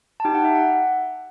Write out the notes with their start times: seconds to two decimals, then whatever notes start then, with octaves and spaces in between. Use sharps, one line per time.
0.20 A5
0.25 D#4 G4 G5
0.34 F#5
0.45 E5
0.55 F#5